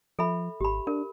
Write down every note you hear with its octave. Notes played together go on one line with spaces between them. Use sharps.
F3 A4 E5 B5
G#1 G4 B5
D4 A#4